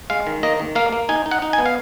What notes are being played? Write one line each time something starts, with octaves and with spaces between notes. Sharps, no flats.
G#3 F5
D#3
A#3 D#5
D#3
A#3 F5
A#3
D#4 G#5
D#4
F#5
D#4
G#5
B3
F5